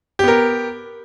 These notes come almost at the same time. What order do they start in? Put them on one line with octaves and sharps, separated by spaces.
G4 B3 A#4